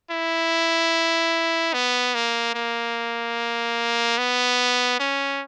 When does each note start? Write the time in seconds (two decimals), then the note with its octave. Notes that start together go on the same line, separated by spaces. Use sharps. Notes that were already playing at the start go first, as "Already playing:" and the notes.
0.11 E4
1.73 B3
2.15 A#3
2.54 A#3
4.18 B3
5.00 C#4